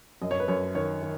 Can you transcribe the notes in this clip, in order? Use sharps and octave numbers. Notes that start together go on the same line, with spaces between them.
F#2 D#5
C#5
B4
F#2 C#5
D#3 C#5
D#3